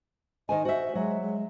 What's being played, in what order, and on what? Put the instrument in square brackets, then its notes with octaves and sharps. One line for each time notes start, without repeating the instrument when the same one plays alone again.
[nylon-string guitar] D#3 C5 G#5 [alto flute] D#5
[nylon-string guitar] F#4 E5 [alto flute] C5
[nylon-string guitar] F#3 [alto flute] G#3
[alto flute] G#3